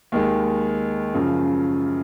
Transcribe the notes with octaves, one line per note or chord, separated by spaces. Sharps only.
D#2 D#3 G#3
F#2 C#3 F3